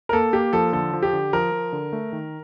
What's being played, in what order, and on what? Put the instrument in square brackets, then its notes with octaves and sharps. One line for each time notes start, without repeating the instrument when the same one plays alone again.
[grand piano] A#4
[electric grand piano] A#3 [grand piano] A4
[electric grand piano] A#3 [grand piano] G4
[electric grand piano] F3 [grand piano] A4
[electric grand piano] D3 [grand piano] A4
[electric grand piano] F3
[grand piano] G4
[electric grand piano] D3
[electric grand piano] F3 [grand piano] A#4
[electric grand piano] F3
D3
A3
D#3